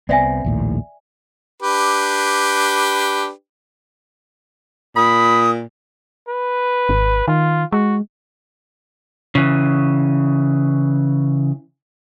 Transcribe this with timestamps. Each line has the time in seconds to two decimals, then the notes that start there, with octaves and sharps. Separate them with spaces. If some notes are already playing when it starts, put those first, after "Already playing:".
0.09 C2 B3 C4 D5 E5 G#5
0.45 A#1 D#2 A2
1.63 D4 G4 B4
4.96 A#2 B5 D#6
6.29 B4
6.89 G#1
7.28 D#3 F4
7.72 G#3 F#4
9.35 C#3 E3